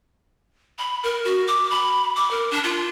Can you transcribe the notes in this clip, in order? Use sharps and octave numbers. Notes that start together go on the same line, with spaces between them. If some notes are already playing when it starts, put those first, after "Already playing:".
B5
A#4
F#4
D6
B5
D6
A#4
D4
F4